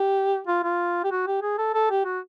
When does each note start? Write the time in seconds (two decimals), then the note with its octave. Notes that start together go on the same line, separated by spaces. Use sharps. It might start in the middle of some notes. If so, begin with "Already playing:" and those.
Already playing: G4
0.47 F4
0.63 F4
1.04 G4
1.11 F#4
1.27 G4
1.42 G#4
1.58 A4
1.74 A4
1.90 G4
2.05 F#4